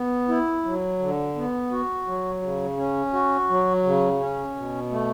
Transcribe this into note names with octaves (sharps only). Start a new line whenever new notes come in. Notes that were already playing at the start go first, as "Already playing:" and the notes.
Already playing: B3
E4
F#3
D3
B3
F#4
F#3
C#3
C#4
F#4
F#3
C#3
C#4
B2
A3